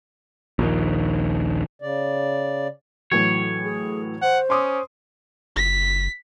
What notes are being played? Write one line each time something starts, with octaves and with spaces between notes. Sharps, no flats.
A#1 D#2
C#3 D5
A2 E3 F#3 C#5
G#4
C5 F#5
C#4 C6 D6 D#6
F#1 B6